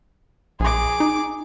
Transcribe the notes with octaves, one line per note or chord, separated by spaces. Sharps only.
A#1 G#4 D6
D#4